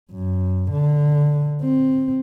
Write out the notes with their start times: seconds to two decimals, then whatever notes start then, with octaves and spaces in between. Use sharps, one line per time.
0.12 F#2
0.71 D3
1.61 C4